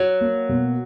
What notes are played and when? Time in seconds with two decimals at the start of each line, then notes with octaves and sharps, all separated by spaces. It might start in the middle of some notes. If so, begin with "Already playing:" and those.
Already playing: F#3 F#4
0.21 A#3
0.49 B2